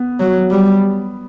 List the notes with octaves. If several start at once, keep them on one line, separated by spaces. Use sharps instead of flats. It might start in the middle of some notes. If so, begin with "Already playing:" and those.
Already playing: B3
F#3
G3